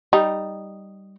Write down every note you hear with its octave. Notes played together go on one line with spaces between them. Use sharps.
G3 D#4